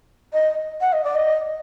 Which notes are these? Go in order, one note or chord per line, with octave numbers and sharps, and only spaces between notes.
D#5
F#5
D#5
D5
D#5